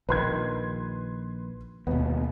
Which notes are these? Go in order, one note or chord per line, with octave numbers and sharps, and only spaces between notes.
A#1 D#3 B4 C6 G#6
D#2 B2 B3